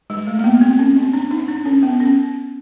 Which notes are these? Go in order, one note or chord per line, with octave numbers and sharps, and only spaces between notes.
G#3
A3
A#3
B3
C4
C#4
C4
D4
D#4
D4
C#4
B3
C#4